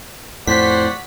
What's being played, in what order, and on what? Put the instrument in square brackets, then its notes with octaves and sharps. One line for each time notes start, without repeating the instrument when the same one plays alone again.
[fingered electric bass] F2 A2 [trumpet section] F#4 D5 F#5 [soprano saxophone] C5 [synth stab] B6